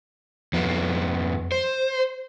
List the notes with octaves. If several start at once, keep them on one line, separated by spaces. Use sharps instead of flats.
F2 F3 B3
C5